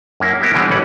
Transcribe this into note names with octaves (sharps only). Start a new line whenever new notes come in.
F#2 A#3 E4
A#3 B3 E4 G4
B2 D3 E3 G3 G#3 C4
A1 E3 G3 C#4 F#5